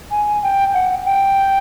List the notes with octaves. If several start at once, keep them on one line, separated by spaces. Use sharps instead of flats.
G#5
G5
F#5
G5